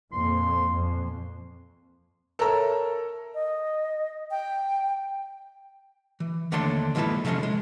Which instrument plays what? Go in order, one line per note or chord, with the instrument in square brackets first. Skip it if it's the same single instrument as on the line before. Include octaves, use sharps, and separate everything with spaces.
[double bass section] F2 A#2 [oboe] C6
[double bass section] F2
[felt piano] A4 A#4 C#5 E5 A#5 E6
[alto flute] D#5
G5
[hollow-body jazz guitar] E3
D#2 D3 A3 D4 C#5 C6
D#2 F3 G#3 E4 A4 B4
C3 F3 G#3 A3 C#4
G#3